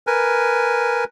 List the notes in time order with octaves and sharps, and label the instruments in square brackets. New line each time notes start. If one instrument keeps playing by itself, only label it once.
[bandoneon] A#4 B4 G#5